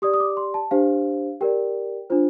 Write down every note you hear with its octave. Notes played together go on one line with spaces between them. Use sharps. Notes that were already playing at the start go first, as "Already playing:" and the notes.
G4 D5 D#6
D#6
D6
C6
A5
D4 G4 C5 F5
G4 A#4 D5 G5
D4 F4 C5